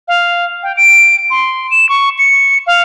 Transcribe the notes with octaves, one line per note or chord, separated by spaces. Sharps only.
F5
G5
D7
C6
E7
C#6
C#7
F5